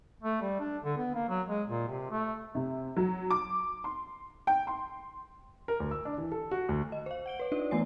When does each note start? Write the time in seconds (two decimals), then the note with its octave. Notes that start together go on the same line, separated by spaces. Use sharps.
0.23 A3
0.41 G3
0.60 D4
0.84 D3
0.97 B3
1.15 A#3
1.29 F#3
1.49 G#3
1.68 A#2
1.88 C3
2.11 A3
2.55 C3
2.96 F#3
3.31 D6
3.84 C6
4.47 G5
4.67 C6
5.68 A#4
5.80 D2
5.91 E6
6.05 D4
6.18 E3
6.32 A4
6.51 F#4
6.69 D2
6.92 D#5
7.06 C5 F5
7.26 F#5 D7 G7
7.40 B4 C#5
7.52 D4 D#4 F4 B4 D5
7.71 E3 A3 B3 G#5 C7